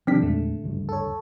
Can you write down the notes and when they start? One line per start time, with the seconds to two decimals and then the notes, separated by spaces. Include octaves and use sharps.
0.07 C3 D#3 F3 G3 C4 D4 B6
0.22 E2 A#2 D3 G#3 A3
0.64 F#1 D2 G2
0.89 A4 C#5